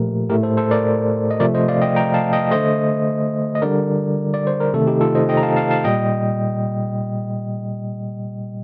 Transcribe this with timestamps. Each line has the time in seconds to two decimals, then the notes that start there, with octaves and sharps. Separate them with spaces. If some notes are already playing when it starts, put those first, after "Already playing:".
Already playing: A#2 F3 A3 G4 A#4
0.30 A2 A3 G4 A#4
0.43 A4 C5
0.57 A4 C5
0.71 A#4 D5
1.31 D#5
1.40 C3 F3 A3 A#4 D5
1.54 C5 D#5
1.68 D5 F5
1.82 D#5 G5
1.96 G5 A#5
2.14 F5 A5
2.33 D#5 G5
2.51 D3 A3 C5 D#5
3.55 D#5
3.62 D3 G3 A#4 D5
4.34 D5
4.47 C5
4.60 A#4
4.73 C3 D#3 A3 A4
4.87 D#4 G4
5.01 F4 A4
5.15 C5 D#5
5.29 D#5 G5
5.37 A#5
5.43 F5 A5
5.56 F5 A5
5.71 F5 A5
5.84 A#2 G3 D#5 G5